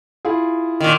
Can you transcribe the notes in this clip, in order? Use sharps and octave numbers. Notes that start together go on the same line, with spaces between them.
E4 F4 G#4
A#2 D#3